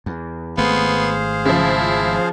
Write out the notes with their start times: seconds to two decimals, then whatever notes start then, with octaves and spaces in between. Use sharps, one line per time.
0.06 E2
0.58 G#1 A3 B3 G#4 C5 F5
1.45 C#3 F3 E4